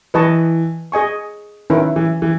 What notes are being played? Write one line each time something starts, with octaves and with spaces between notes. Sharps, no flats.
E3 B4 D#5 A5 C#6
G#4 D#5 G#5 C#6
D#3 C#4 E4 B4
E3
E3